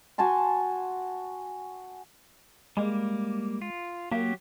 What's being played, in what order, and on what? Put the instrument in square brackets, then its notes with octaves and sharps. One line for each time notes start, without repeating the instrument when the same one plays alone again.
[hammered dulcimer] F#4 G#5 A5 C6
[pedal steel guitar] G3 A#3 [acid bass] G#3
[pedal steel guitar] F4
[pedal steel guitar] F#3 G4 [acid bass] A#3